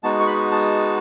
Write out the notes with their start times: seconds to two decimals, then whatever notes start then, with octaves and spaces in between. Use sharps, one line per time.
0.03 G#3 B3 D#4 F#4 A5
0.20 C#6
0.27 B5
0.52 A5